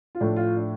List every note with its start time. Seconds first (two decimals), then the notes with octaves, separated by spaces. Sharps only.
0.15 F4
0.20 A2 F3 A3 D4
0.36 F4
0.57 D4